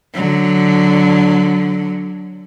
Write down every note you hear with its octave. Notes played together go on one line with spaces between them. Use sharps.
D3 F#3